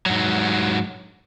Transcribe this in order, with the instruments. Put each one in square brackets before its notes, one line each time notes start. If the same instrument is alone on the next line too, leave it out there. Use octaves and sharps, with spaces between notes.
[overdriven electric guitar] G#2 F#3